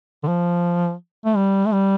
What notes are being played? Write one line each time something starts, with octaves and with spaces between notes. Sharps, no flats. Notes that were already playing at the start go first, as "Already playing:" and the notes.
D3
F3
A3
G3
A3
G3